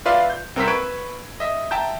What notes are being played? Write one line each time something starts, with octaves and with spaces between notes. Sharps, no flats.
F4 B4 D5 E5 F5 C6
G6
C2 C4 A#4 C5 E6 B6
B4 B5 C#6 G#6 D7
D#5 E5
E5 G5 A5 A#5 G6